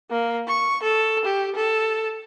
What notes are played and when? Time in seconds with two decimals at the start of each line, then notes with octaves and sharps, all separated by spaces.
0.10 A#3
0.48 C#6
0.83 A4
1.25 G4
1.56 A4